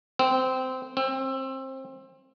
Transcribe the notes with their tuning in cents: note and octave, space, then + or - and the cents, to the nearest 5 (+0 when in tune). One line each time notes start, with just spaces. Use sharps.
C4 -15
C4 +25